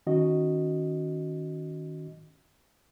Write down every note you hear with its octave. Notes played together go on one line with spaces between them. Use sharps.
D#3 C#4 F#4 D#5